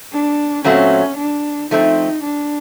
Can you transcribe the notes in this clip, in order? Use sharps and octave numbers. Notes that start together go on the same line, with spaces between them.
D4
A#2 F#3 A3 C4 C#4
D4
F3 A3 C4 D#4
D4